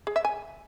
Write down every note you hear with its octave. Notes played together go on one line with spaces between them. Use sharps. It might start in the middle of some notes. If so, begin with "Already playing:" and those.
G#4
E5
G#5